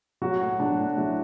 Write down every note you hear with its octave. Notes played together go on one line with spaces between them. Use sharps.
F#3 F#4
A2
F#3 D4
A2
F#3 E4